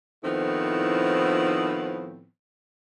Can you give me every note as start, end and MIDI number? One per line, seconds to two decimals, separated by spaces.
0.23 2.26 45
0.23 2.26 51
0.23 2.26 53
0.23 2.26 59
0.23 2.26 60
0.23 2.26 64